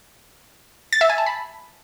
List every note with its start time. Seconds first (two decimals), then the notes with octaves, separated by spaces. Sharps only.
0.93 A6
1.01 E5
1.10 G#5
1.18 A5
1.26 B5